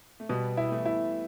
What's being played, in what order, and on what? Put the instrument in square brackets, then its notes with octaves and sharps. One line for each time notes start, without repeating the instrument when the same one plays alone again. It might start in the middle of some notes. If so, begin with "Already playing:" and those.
[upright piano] A3
[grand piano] B2 [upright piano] G3 B3
[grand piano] E4
[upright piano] E3 A3
[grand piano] E4